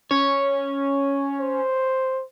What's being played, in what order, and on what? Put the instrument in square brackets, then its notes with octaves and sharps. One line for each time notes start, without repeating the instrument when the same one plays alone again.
[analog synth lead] C#4 [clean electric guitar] C#5
[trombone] C5